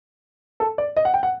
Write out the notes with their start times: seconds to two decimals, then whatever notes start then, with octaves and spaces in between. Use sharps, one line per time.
0.60 A4
0.78 D5
0.97 D#5
1.05 F#5
1.14 G5
1.23 F#5